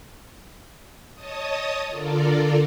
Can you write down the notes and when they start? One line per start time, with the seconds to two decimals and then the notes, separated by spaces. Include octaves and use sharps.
1.14 C#5 D#5 A5 D#6
1.89 D3 F4 A4 A#4 D5